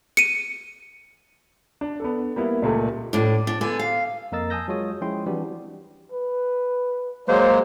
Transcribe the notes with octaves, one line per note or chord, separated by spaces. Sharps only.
C#7 D#7
D4
B3 D4 A4
G3 A#3 B3 E4
C#2 A#2 G3 A3 A4
A2 D4
D4
D3 B3 G#5
F5
F2 A#3 A#4 D#5 E6 A6
G#5 A5 D#6 E6 G6 A#6
F#3 G#3 F4 C#5 D#6
F3 G#3 C#4 E4 G5 C6
E3 G3 C4 D4 F#4 G4
B4
F#3 G#3 A#3 C5 C#5